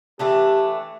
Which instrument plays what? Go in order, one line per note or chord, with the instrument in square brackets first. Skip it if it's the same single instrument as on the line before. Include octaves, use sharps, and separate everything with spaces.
[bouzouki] E3 A3 D4 [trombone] G4